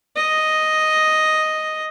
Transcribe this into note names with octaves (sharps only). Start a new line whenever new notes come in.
D#5